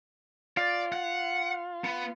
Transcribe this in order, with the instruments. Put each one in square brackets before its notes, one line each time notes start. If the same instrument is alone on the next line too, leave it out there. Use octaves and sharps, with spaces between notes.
[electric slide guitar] F4 [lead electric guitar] D5
[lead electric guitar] F#5
B3